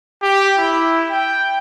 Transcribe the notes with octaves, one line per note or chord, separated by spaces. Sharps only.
G4
E4
G5